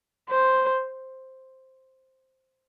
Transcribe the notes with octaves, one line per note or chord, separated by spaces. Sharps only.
C5